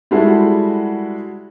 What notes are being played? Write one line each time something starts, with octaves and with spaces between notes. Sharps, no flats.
G3 G#3 E4 F#4 G#4 A4